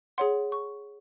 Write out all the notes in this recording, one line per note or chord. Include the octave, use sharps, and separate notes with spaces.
G#4 C#5 F#5 C6
C#6